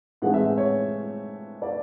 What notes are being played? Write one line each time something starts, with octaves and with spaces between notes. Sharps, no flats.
A2 E3 G#3 C4 D#4 F#5
E5
C#5
D5